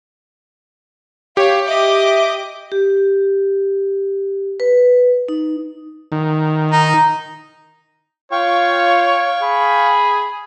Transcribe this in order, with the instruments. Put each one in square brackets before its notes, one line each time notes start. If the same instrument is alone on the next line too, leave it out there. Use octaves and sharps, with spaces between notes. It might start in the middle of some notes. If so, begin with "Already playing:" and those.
[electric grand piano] G4 [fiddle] C#5 [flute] F5
[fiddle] D#5 D6 [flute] E5
[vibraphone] G4
B4
D#4
[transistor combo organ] D#3
[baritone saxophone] D#4
[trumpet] F4 [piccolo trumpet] C#5 [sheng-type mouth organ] F5 G5 C#6
[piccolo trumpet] G#4 [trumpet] B5